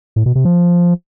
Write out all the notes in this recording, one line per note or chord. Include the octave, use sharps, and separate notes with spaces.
A2
B2
C3
F3